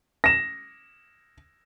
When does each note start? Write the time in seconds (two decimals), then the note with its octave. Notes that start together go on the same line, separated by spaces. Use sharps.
0.24 A#6 E7